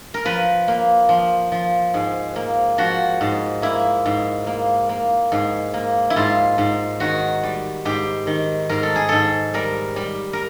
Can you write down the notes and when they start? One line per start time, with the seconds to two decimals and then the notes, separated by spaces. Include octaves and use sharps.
0.14 A#4
0.25 F3 B4
0.68 A#3
1.09 F3
1.52 F3
1.94 G#2
2.36 A#3
2.78 F3 F#4
3.21 G#2
3.62 A#3 E4
4.06 G#2
4.47 A#3
4.89 A#3
5.32 G#2
5.74 A#3
6.10 E4
6.16 G#2 F4
6.58 G#2
7.00 D#3 F#4
7.43 G3
7.85 G#2 G4
8.27 D#3
8.69 G#2 A#4
8.83 A4
8.96 G#4
9.09 G#2 A4
9.54 G3 A#4
9.96 G3
10.33 A#4